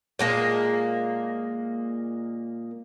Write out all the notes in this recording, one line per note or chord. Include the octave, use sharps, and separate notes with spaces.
A#2 G#3 A#3 A5